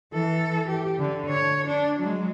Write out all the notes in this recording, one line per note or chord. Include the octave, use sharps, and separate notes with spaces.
E3 A4
G4
D3
C#5
D4
F#3 G#3